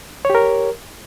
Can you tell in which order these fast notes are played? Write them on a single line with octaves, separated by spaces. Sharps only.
C#5 G4 A#4